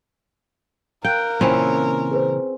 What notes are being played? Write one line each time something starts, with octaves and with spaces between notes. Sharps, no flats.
A#4 F5 G5 F#6
A#2 C#3 E3 C4 C#4 E4
G#4 B4 C5